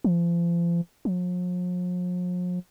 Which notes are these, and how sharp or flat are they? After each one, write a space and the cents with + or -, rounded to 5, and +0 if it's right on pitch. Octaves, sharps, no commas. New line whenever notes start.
F3 -35
F3 +45